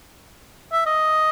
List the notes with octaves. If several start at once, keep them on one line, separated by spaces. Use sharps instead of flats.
E5
D#5